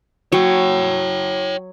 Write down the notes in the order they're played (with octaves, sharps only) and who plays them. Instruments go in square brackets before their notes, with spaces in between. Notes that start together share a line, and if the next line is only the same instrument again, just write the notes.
[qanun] F#3 [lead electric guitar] C#5 G5